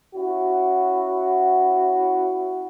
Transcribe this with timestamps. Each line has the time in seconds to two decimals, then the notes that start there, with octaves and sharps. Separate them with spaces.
0.15 C#4 E4 F#4